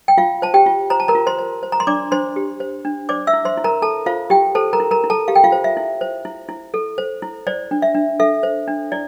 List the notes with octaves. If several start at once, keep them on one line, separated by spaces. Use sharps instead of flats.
G5
F4 F5
C5 A5
G4 G5
F4
C5 A#5
A5
A#4 A#5
F4
C5 C6
C5
C5
A#5
C6
D4 D5 D6
D4 C5 C6
G4
C5
D4
C5 D5 D6
E5 E6
E4
C5 C6
E4
A#4 A#5
A4 A5
F4 C5 F5
E4 G4 G5
A4 C5 A5
A#4 A#5
E4
A#4 A#5
E4
A4 A5
G4 F5
G5
F4 F5
C5
E5
E4
C5
E4
E4
A4
C5
E4
C5 D5
D4
E5
D4
A4 E5
C5
D4
E4 D5